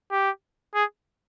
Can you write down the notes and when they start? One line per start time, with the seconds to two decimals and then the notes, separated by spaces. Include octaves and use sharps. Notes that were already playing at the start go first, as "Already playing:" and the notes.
0.11 G4
0.75 G#4